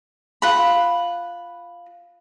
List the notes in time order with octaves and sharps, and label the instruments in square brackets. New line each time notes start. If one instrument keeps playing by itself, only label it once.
[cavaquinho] F4 F#5 B5